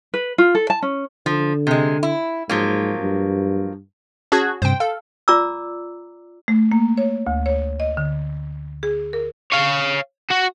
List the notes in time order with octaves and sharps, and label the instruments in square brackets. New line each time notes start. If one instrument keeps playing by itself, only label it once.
[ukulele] B4
F4
A4
A5
C#4
[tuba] D3 [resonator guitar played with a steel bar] F3
[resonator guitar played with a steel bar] C3 G#3
E4
[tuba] G#2 [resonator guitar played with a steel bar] F3 F#3 A#3
[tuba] G2
[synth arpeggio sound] C#4 F#4 G#4 [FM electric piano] A5 F#6 G#6
[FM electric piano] G2 C3 [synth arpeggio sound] C5 G5
[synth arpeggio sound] A4 [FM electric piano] F5
[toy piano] F4 D5 A#5 D6 E6
[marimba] A3
A#3
C#5
D2
C#5
D#5
D3
G#4
A#4
[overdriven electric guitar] C#5 F5
F#4